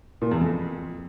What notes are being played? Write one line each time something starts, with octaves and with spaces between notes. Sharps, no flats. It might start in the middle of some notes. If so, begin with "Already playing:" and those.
A#2
E2
F2